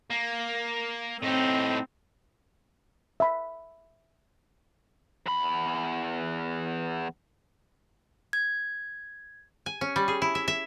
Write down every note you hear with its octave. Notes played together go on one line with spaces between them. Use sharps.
A#3
A2 C4 D#4
E5 B5
E2 B5
G#6
G#5
C#4
G3
G#4
E4
E5
E5